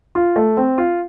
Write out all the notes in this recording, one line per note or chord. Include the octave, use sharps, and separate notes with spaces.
F4
A3
C4
F4